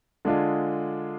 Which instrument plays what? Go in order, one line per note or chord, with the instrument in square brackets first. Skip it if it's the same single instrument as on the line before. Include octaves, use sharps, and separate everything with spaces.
[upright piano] D3 G#3 D4 F4 G#4